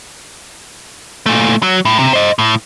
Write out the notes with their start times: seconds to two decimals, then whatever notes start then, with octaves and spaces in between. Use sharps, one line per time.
1.26 A#2 A3
1.63 F#3
1.85 A2
1.99 C3
2.13 C5 D#5
2.39 A2